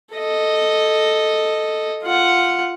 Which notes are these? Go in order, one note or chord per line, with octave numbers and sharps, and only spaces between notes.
A4 D#5
F4 F#5